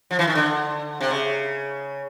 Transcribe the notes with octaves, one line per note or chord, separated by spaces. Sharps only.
F3
E3
D#3
D3
C3
C#3